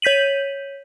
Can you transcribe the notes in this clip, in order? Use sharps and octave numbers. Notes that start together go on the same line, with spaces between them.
C#5 G6 B6 D#7 F#7